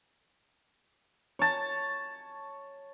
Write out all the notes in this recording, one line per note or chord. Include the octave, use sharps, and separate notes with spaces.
C#5 A5